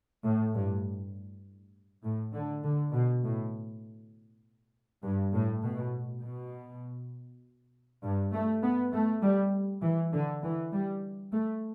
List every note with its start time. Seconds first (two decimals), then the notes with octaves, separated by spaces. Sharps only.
0.24 A2
0.53 G2
2.04 A2
2.33 D3
2.63 D3
2.93 B2
3.24 A2
5.03 G2
5.34 A2
5.63 B2
6.23 B2
8.04 G2
8.33 A3
8.63 B3
8.93 A3
9.23 G3
9.83 E3
10.13 D3
10.43 E3
10.73 G3
11.32 A3